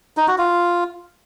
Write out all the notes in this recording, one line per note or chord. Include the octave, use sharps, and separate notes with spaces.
D#4
F#4
F4